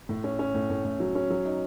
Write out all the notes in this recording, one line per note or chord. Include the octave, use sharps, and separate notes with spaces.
A2
C#4
C#4
A2
A2
A2
F#3
C#4
F#3
D#4